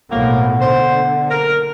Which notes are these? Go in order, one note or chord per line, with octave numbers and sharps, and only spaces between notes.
B1 F2 A2 A#3 B3 F#5
D3 C5
F#1 A#4